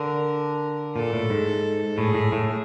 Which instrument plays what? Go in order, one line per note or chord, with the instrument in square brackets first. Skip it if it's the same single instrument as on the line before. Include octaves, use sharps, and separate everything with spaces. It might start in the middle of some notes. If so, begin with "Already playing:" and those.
Already playing: [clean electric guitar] D3 [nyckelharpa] A#4
[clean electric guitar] A#2 [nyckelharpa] A4
[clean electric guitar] A2
G#2
[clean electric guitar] A2 [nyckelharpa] G#4
[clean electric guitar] A2
A2